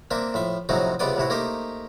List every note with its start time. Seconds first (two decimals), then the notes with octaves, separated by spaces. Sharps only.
0.11 A#3 C4 D4 E5
0.34 A2 F3 E5
0.69 A2 C3 F3 F#3 C4 D#4
0.99 C#2 C3 B3 D5 G5 D#6
1.17 A1 C3 E4 F#4
1.30 A3 A#3 D#4 G4 C5